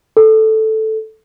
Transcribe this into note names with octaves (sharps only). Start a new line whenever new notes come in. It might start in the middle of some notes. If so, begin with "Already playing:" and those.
A4